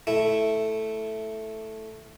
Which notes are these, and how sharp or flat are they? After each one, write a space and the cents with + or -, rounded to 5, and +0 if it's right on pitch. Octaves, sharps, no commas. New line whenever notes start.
A3 +0 E4 +0